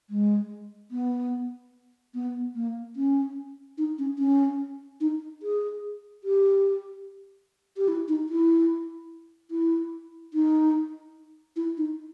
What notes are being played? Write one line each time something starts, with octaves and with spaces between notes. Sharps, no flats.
G#3
B3
B3
A#3
C#4
D#4
C#4
C#4
D#4
G#4
G4
G4
E4
D#4
E4
E4
D#4
E4
D#4